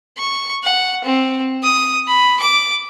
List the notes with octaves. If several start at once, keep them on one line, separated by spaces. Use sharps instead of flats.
C#6
F#5
C4
D#6
B5
D6